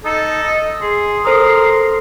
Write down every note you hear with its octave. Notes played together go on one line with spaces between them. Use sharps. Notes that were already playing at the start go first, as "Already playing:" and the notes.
D#4 A4
D#5
G#4 C6
A4 A#4 C5 D#6